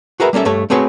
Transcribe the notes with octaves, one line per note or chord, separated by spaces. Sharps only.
F#4 G#4 A#4 B4 E5
G3 A#3 C#4 A4 E5
G2 A3 A4 C#5
A3 C4 F#4 G#4 B4 C#5